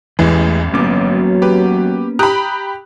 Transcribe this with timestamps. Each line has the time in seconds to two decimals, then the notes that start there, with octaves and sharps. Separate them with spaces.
0.19 A1 E2 E3 G#3
0.74 G1 F#3 A#3 B3 C#4 D6
1.42 G4 B4
2.19 G4 A#5 B5 D#6 F#6